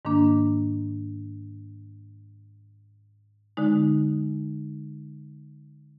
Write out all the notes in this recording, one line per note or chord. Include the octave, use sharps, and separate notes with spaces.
G#2 D#3 A#3 D4
D3 G#3 D#4